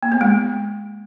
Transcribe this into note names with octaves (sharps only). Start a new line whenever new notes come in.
A#3
B3
G#3